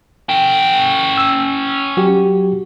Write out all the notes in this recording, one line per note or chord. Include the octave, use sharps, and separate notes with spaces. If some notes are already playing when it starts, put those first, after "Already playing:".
C#4 G5
E6
F#3 F#4 G4